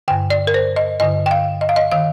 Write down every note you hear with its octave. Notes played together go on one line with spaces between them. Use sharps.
G2 D3 G5
D5
A#4
C5
D#5
G2 D3 D#5
G5
F5
D#5
F5
D#5
D#3 F5